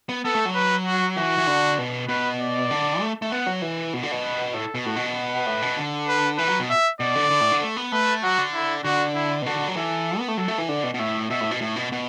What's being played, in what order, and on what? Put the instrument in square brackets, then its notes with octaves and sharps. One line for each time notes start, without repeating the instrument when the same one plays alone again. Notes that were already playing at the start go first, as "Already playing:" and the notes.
[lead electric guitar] B3
[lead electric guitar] B3 [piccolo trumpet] A4
[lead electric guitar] A3
F#3
[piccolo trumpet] B4
F#4
[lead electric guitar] E3 [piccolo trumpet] F#4
[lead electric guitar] E3
D3
B2
[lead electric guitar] B2 [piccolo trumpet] B4
[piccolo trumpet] D5
[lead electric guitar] D3
A3
A3
[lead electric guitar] B3 [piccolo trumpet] F#5
[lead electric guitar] F#3
E3
B2
D3
B2
[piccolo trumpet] B4
[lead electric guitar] A2 [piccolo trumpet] A4
[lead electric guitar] B2
[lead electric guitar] A2 [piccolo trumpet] F#4
[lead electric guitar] B2
[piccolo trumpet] B4
[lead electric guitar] A2
B2
D3
[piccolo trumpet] B4
[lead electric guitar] E3 [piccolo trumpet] B4
[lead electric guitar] F#3
B2
[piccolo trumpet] E5
[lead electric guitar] B2 [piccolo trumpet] D5
[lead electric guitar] D3
D3
A2
D3
A3
B3
[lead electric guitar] A3 [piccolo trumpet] B4
[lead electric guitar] F#3 [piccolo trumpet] F#4
[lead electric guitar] D3
[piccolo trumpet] E4
[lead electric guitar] D3 [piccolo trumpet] F#4
[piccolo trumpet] E4
[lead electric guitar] B2
[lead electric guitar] D3 [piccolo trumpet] F#4
[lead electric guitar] F#3
[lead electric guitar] E3 [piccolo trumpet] A4
[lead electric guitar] B3
A3
[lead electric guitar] F#3 [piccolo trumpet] A4
[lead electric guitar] A3
E3
[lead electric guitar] D3 [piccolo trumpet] D5
[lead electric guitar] B2
B2
[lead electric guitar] A2 [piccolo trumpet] E5
[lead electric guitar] B2 [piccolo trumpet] E5
[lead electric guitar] A2
B2
A2
B2
B2